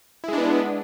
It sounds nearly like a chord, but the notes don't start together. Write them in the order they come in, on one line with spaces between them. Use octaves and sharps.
E4 G#3 D4 B3